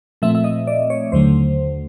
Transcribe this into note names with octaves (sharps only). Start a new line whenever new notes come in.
A#2 F3 A3 C4 E5
E5
D#5
D5
C#5
D#2 D3 F#3 A3 C5